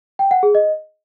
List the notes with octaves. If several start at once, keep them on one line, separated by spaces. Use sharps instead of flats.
G5
F#5
G#4
D#5